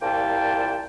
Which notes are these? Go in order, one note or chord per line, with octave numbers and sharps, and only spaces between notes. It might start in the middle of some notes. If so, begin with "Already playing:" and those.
C2 A#2 G5 A5